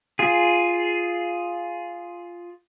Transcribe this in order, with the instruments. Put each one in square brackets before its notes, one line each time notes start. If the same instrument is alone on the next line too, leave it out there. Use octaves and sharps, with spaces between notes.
[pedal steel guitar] F4 G#4